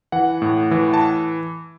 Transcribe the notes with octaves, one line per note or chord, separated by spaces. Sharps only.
E3 F#5
A2
E3
A5